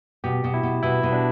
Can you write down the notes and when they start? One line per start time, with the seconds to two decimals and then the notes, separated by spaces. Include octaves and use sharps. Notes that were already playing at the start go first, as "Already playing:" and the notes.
0.24 B2 G4
0.44 B2
0.54 E4
0.63 B2
0.83 B2 E4
1.03 B2
1.13 D4